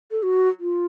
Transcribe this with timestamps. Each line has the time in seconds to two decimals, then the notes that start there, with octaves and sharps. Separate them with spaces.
0.11 A4
0.23 F#4
0.60 F4